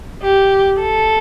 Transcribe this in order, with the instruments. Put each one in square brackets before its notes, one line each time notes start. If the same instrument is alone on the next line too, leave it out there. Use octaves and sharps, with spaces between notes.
[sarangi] G4
A4